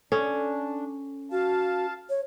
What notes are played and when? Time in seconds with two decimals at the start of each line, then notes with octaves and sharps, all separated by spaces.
0.12 C#4 D4 A4
1.32 F#4 F5 A5
2.10 C#5